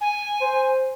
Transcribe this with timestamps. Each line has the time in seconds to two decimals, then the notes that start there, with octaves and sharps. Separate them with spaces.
0.01 G#5
0.41 C5